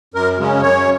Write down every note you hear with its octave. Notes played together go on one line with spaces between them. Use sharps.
F#2 A#4
C#3 G#3 C#4
F#2 C#5